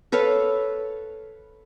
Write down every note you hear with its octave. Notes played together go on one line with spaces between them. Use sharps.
A4 B4 C#5 F5